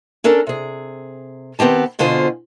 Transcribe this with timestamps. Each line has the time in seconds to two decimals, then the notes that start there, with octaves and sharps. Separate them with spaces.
0.24 C#4 D4 A4 A#4
0.47 C3 G#4
1.59 D#3 B3 C4 G4 A5
1.99 F2 B2 D3 F4 C5 G#5